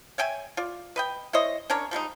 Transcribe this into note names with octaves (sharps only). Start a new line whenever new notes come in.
C#5 E5 G5 G#5
F4 D5
B4 D#5 G5
E4 C5 C#5 D#5
C#4 D4 A#4 C#5
F3 G3 G#3 D#4